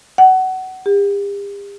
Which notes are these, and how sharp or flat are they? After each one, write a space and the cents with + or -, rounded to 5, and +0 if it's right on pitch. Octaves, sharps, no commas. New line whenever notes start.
F#5 +20
G4 +40